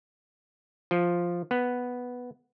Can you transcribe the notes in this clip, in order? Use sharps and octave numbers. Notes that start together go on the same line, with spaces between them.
F3
B3